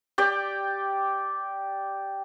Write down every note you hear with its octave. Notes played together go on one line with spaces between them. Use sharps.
G4 D5 G5